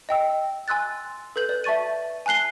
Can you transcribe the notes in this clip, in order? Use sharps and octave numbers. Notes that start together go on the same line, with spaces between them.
D#5 G5 E6
G#5 C6 E6 F#6 A6
A4 B4 G6 F#7
B4 D5
E5 A5 C#6 A6 D#7
G#5 A5 F#6 C7 G7